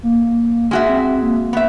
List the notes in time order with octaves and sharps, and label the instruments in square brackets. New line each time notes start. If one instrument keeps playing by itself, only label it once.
[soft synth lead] A#3
[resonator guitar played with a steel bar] G#3 F#4 E5 [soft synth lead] F6
[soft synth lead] C4
A#3
[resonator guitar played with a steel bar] B3 E5